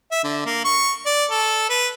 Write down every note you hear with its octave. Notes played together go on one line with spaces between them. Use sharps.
E5
D3
A#3
C#6
D5
A4
B4